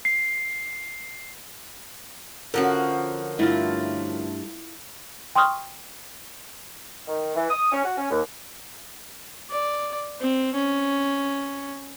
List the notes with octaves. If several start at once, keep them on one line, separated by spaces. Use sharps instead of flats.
C7
D3 F3 C#4 F#4 A#4
G2 A3 E4 F4
G5 C6 C#6 D#6 F6
D#3
E3
D#6
C#4
F#4
C#4
D#2
D5
C4
C#4